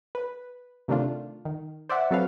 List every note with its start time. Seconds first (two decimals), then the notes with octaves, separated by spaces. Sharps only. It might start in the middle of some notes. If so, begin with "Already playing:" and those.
0.15 B4
0.88 C3 D#3 A3 D4 F4
1.45 D#3
1.89 C5 D5 E5 F#5
2.11 F#3 C4 A4 B4 F5